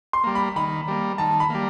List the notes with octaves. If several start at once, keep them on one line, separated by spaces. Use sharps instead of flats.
C6
G3 A#3
B5
D#3 B5
G3 A#3
D#3 A5
B5
G3 A#3